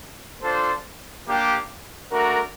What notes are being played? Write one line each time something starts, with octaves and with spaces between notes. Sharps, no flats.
D4 F4 A4 C5
A#3 D4 G4
A3 D4 F#4 A#4